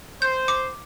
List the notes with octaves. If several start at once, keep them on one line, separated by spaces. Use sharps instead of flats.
C5 G6
D6